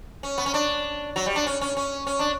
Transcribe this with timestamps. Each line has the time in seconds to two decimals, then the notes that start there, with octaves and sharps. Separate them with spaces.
0.23 C#4
0.38 B3
0.46 C#4
0.54 D4
1.16 F#3
1.26 G3
1.36 D4
1.47 C#4
1.61 C#4
1.77 C#4
2.07 C#4
2.19 D4